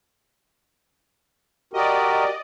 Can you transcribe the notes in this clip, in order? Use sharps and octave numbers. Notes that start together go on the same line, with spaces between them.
F#4 G4 A#4 D5 D#5